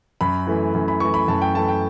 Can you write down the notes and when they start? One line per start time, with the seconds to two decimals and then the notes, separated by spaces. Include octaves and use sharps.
0.21 F#2 B5
0.47 E3 A3
0.75 F#2
0.88 B5
1.00 E3 A3 C#6
1.14 B5
1.28 F#2 A5
1.42 G5
1.55 E3 A3 A5
1.69 G5